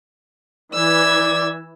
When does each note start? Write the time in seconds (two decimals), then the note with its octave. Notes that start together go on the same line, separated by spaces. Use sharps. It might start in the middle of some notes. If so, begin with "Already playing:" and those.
0.74 E3 D5 E6 G#6